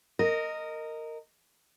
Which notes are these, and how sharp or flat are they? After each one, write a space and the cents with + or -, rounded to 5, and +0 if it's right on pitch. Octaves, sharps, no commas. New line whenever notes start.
A#4 -15 D#5 +0